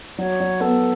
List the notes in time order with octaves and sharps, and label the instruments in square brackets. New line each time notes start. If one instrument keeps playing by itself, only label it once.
[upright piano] F#3 [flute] C#5
[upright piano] F#3
[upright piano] B3 [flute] A4